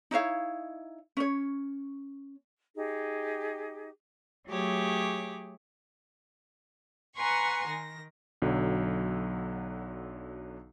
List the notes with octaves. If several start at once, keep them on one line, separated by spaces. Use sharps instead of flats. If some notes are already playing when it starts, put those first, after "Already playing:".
D#4 E4 C#5 F5
C#4 C#5
D#4 G4 G#4
F#3 A3 G4 G#4 C#5 D6
B4 F#5 G#5 A#5 C6 C#6
D#3 A#6
B1 D3 F#3